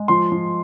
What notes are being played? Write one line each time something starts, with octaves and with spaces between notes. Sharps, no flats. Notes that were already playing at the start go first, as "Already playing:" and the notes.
Already playing: G#3
F3 C6
F3